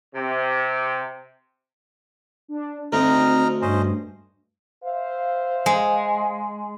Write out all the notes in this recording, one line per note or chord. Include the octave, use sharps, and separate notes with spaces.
C3
D4
D2 C4 D#4 A#5 F6
G2 C#4 C5 D#5
C5 E5 F5
G#3